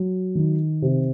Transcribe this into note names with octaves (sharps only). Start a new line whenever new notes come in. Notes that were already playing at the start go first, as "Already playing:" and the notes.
Already playing: F#3
D#3
C3